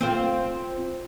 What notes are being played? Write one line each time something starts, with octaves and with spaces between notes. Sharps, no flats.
C4 F4 C5